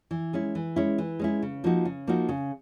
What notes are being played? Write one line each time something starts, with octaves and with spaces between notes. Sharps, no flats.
E3
G#3 C#4 E4
E3
G#3 C#4 E4
E3
G#3 C#4 E4
C#3
F3 A#3 D#4 F#4
C#3
F3 A#3 D#4 F#4
C#3